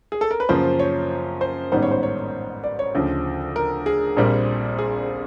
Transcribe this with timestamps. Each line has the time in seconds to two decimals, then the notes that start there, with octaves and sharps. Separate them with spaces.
0.12 G#4
0.21 A4
0.31 A#4
0.40 B4
0.49 F#2 C#3 F3 A#3 C5
0.79 C#5
1.41 C5
1.72 A1 G#2 D#3 G3 B3 C5
1.82 C#5
1.91 C5
2.03 C#5
2.64 D5
2.79 C#5
2.95 D2 C#3 F3
3.56 A#4
3.86 G#4
4.17 A#1 A#2 G3 C4
4.78 G#4